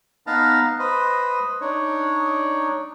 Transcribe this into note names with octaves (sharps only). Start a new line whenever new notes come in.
B3 D#4 B4 F5 A5 A#5
B4 C5 D#5
D4 D#4 C#5